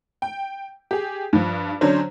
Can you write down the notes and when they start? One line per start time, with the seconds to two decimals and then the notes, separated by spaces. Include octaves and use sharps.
0.22 G5
0.91 G4 G#4
1.33 G2 F3
1.81 D3 F#3 C#4 D4 C5